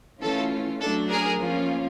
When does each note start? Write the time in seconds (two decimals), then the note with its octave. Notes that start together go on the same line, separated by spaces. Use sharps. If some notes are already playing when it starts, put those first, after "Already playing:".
0.21 E3 A3 C#4 F4 A4
0.81 F#3 A3 D4 A4
1.10 G#4 A#4
1.40 F3 A#3 C#4 F4